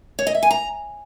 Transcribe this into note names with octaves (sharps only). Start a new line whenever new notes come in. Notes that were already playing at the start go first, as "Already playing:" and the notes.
C#5
D#5
E5
G#5
A#5